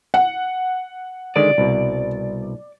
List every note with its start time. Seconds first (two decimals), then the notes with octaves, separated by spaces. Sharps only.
0.14 F#5
1.36 D3 D#3 G#3 D5
1.58 C2 B2